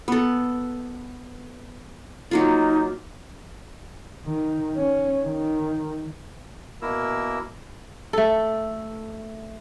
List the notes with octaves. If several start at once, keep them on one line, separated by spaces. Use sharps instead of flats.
B3 A4
F#3 A#3 D#4 F4
D#3
C#4
D#3
B2 A#3 E4 A#4 E6
A3 A4